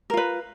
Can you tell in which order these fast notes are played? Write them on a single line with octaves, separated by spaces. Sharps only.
A#4 F4 B4